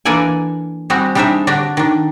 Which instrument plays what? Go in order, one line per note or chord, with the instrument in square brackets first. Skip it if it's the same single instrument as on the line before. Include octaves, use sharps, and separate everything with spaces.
[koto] E3 A#3 D4 A4 D5 G#5
G3 G#3 C4 F#4
G3 G#3 D4 D#4 C5 E5
D3 D4 F#4 G4
D#3 D4